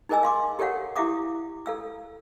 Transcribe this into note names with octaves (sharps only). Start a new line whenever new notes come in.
D#4 G#4 A#4 D#5 G#5 E6
F5 C6 D6
G4 A4 A#4 C#5 F5 F#5
E4 G4 E5 F5 D6 D#6
A4 F5 E6